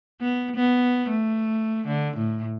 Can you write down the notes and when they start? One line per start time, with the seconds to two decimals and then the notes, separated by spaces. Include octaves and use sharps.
0.21 B3
0.56 B3
1.09 A3
1.87 D3
2.17 A2